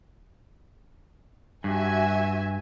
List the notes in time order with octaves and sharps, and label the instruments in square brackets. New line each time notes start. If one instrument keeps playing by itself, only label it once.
[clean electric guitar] G2 [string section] F#4 E5 G#5